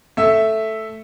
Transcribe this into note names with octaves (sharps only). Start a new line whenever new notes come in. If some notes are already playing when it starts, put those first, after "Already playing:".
A3 E5